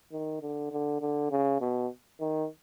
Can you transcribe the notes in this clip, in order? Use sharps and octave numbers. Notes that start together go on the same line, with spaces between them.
D#3
D3
D3
D3
C#3
B2
D#3